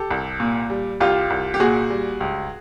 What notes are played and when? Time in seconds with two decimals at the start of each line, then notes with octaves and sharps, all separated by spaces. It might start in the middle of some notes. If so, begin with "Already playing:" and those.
Already playing: G4 A4
0.11 C2
0.40 A#2
0.70 G3
1.00 C2 F4 G4
1.30 C2
1.54 G4
1.60 A#2 F#4 G#4
1.90 G3
2.20 C#2